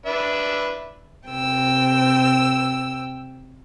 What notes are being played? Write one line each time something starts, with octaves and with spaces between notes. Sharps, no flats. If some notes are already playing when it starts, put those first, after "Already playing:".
D4 B4 E5
C3 G5 E6